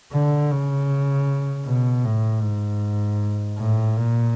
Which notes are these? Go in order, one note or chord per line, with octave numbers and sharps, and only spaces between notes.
D3
C#3
B2
A2
G#2
A2
A#2